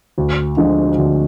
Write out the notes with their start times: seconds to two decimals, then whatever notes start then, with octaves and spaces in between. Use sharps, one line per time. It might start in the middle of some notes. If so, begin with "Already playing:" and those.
0.18 D2
0.57 D3 F3 G#3 D4
0.98 D2